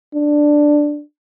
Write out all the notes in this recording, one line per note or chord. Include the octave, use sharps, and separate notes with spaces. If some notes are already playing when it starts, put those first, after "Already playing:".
D4